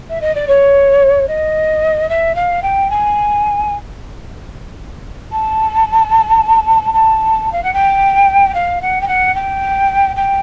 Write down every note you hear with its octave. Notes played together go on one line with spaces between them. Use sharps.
E5
D#5
D5
C#5
D#5
E5
F5
G5
G#5
A5
A5
F5
F#5
G5
F5
F#5
G5
F#5
G5
G5